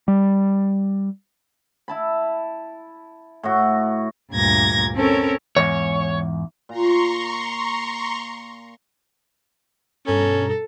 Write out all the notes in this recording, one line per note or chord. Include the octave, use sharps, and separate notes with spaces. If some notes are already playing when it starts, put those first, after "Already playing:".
G3
E4 A5 B5
A2 F#4
D2 G2 A#2 G#6 A#6
C4 C#4 A4 A#4 C#5
E2 G#2 C#5
A#2 A#5 C6 C#6
G2 B2 C#4 A4 A#5